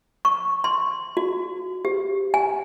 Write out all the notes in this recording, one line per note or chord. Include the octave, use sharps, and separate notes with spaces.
C#6
C6
F#4
G4
G#5